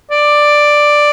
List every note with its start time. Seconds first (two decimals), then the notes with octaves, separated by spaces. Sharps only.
0.11 D5